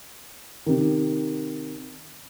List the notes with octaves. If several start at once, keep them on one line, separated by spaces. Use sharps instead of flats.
C3 D#3